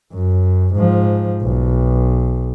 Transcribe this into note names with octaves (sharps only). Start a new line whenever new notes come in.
F#2
G#2 F3
B1